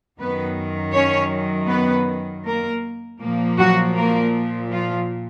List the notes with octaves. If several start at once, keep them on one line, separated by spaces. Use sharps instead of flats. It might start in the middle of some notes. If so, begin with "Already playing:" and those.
F#2 D#3 F#3 B3 B4
C#4 C#5
B3 B4
A#3 A#4
A#2 F3 A#3
F#3 F#4
A#3 A#4
F3 F4